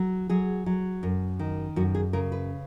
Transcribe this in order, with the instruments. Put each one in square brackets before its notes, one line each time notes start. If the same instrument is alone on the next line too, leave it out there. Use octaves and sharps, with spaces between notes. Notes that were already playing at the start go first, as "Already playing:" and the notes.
Already playing: [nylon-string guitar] F#3
F#3 G#4
F#3
F#2
D#3
F#2 F#4
G#4
C#3 A#4
B4